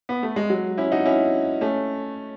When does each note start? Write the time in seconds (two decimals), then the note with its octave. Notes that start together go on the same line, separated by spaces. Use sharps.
0.09 B3
0.23 A3
0.36 G#3
0.50 F#3
0.78 C#4 E4
0.92 D#4 F#4
1.05 C#4 E4
1.61 A3 C#4